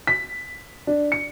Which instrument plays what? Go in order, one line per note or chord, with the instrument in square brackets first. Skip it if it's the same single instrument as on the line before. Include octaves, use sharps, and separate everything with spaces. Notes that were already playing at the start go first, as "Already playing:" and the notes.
[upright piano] B6
D4
C#7